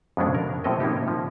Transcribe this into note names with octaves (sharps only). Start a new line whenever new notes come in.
F2 B2 G#3 A3 C#4 D4
A#4
A2 F3 C4 G4 A4 D#5
A#3 C#4 D#4 G4
F3